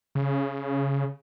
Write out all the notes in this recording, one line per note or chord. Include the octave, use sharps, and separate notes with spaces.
C#3